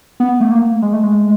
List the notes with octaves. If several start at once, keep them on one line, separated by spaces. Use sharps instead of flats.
B3
A3
A#3
G#3
A3
G#3